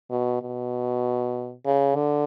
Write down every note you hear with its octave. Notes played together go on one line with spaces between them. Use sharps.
B2
B2
C#3
D3